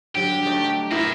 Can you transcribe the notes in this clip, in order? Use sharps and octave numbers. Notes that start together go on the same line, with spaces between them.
D3 F#3 G3 G4
F#3 A3 D#4
B3 E4 A#4 E5